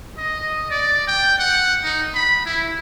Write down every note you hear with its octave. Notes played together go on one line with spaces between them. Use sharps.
D#5
D5
G5
F#5
D#4
B5
E4